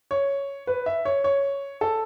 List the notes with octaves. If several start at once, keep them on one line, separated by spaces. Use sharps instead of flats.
C#5
B4
E5
C#5
C#5
A4